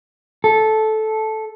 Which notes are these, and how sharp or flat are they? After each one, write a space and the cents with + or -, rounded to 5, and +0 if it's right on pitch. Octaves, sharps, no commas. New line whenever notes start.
A4 -10